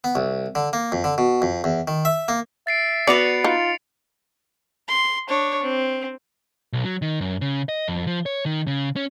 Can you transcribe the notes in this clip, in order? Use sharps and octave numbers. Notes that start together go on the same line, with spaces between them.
B3
C2
D3
A#3
F2
D3
B2
F2
E2
D#3
E5
A#3
E5 A6 C7 D7
B3 F#4 B4 D5 C#7 F7
D#4 F4
C6
D4 C#5
C4
B1
F#3
D#3
F#2
C#3
D#5
F2
F3
C#5
D#3
C#3
C#4